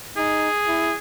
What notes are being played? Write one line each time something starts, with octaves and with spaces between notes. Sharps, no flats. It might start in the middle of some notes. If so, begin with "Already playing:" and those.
D#4 G#4
E4